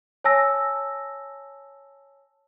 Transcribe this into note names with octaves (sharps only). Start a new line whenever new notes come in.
C#5 G#5 A5 E6 A#6